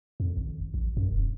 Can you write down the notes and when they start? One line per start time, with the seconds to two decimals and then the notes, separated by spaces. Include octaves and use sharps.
0.20 F2
0.37 G#1
0.74 A1
0.97 F#2
1.12 E1